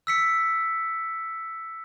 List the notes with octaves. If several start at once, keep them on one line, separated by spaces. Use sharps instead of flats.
E6 B6 C#7